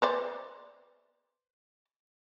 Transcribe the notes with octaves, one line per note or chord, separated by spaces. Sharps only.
B4 C5 D5